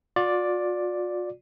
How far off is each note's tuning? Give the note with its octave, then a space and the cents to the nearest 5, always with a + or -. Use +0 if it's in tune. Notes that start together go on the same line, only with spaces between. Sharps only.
F4 +45 D5 +0